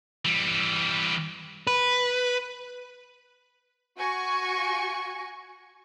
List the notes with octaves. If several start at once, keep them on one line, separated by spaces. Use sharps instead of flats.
E3 G3
B4
F#4 G#5 C#6